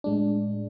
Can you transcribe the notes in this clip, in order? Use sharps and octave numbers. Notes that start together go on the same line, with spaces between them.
A2 G#3 D4